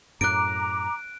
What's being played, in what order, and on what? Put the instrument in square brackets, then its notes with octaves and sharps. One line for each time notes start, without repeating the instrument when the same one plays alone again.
[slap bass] F#2 A2 [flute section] A#5 D6 [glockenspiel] F#6 D7